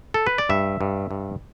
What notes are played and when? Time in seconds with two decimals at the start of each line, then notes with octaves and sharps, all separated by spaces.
0.14 A4
0.26 B4
0.38 D5
0.49 G2 E5
0.81 G2
1.11 G2